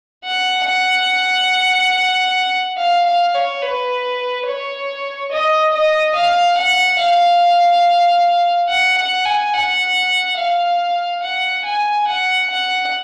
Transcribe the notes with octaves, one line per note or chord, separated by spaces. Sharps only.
F#5
F#5
F5
F5
C#5
B4
C#5
D#5
D#5
F5
F#5
F5
F#5
F#5
G#5
F#5
F5
F#5
G#5
F#5
F#5